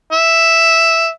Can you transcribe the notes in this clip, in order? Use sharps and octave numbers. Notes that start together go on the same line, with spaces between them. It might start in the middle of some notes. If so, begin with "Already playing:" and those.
E5